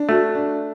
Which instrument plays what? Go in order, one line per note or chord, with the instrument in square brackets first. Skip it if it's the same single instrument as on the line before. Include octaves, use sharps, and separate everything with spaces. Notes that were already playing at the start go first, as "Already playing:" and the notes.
Already playing: [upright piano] D4
[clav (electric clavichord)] A3 [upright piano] F#4
[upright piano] D4